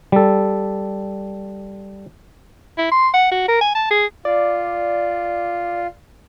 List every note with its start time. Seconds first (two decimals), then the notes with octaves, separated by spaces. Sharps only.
0.12 G3 A4
2.78 E4
2.92 C6
3.14 F#5
3.31 F#4
3.48 A#4
3.61 G#5
3.75 A5
3.91 G#4
4.25 F4 D5